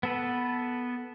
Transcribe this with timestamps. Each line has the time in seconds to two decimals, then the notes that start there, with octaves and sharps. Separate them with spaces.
0.03 B3 A4 B4